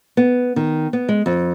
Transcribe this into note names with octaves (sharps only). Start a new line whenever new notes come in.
B3
D#3
B3
G#3
F2